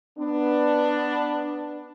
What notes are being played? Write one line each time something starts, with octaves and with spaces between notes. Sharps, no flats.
B3 D4